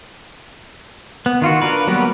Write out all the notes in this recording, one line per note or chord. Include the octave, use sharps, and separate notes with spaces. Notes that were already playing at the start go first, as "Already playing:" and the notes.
B3
D#3 F4 F#4
D4 A#4 B4
F#3 G3 A#3 B3 G4